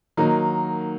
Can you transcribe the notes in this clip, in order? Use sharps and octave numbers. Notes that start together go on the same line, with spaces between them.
D#3 F#3 A#3 D#4